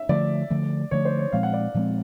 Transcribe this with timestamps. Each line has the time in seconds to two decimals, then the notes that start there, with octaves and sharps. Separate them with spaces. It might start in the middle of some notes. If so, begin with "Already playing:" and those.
Already playing: E5
0.09 D3 F3 A3 D5
0.50 D3 F3 A3
0.91 D3 F3 A3 C#5
1.05 C5
1.19 C#5
1.32 A#2 F3 G#3 C4 F5
1.43 F#5
1.53 D5
1.74 A#2 F3 G#3 C4